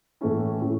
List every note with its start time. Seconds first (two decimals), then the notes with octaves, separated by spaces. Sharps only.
0.21 A2 E3 A3 C#4 E4
0.62 A2 E3 A3 C#4 E4